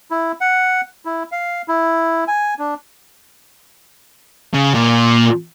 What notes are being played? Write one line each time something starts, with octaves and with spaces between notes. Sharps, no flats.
E4
F#5
E4
F5
E4
G#5
D4
C#3
A#2